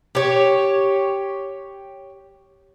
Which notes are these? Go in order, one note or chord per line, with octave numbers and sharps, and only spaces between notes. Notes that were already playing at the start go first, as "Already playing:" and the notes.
G4 C#5